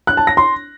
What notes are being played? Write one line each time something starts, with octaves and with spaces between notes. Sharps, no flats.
F#6
A5
A#6
C6